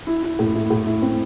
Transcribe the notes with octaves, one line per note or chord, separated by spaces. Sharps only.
E4
E4
A2
E4
A2
E4
C4